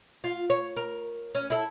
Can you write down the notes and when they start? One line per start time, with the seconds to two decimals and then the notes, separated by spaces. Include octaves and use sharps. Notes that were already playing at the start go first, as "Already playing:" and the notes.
0.24 F4
0.50 C#5
0.76 A#4
1.35 C#4
1.50 E4 A4